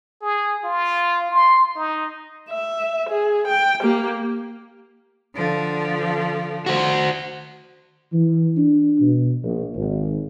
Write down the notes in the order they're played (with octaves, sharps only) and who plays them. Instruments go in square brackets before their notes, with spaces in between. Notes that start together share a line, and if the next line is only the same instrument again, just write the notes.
[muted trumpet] G#4
F4
C6
D#4
[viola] E5
G#4
G5
A#3 G4
[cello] D3 F3
[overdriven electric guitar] F#4 C5
[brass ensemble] E3
D4
B2
A#1
G#1